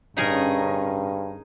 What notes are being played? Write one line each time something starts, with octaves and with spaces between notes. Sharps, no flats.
G2 D3 C#4 D#4 G#4 A#4